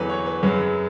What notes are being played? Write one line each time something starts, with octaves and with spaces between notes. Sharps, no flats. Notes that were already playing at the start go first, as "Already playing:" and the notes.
Already playing: E2 D3 F#3 B4
C#5
B4
F#2 C#3 F#3 B4